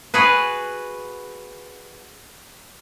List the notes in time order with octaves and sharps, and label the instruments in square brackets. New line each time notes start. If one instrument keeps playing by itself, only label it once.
[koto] F#4 G#4 B4